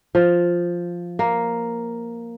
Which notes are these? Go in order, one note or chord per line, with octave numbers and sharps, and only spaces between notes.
F3
A#3